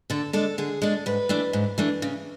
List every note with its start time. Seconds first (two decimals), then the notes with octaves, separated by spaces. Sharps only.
0.10 D3 A4
0.33 G#3 D4 A4
0.58 D3 G#4
0.82 G#3 D4 A4
1.06 G#2 B4
1.29 E3 A3 D4
1.53 G#2
1.78 E3 A3 D4
2.02 C#3